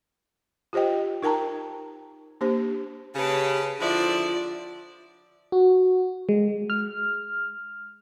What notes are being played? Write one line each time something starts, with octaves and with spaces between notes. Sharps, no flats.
F4 G4 C5 D#5 G5
D#4 A#4 G5 A5 A#5
A#3 D4 G4 C5
C#3 G4 B4 A5
D3 F3 E4 F4 D5
F#4
G#3
F6